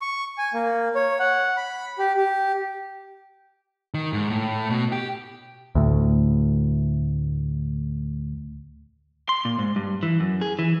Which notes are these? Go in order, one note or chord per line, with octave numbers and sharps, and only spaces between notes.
C#6
G#5
A#3
C#5
F#5
B5
G4
G4
D#3
G#2
A2
B2
G4
D2 A2
C6
A#2
G#2
G2
E3
F#2
G#4
E3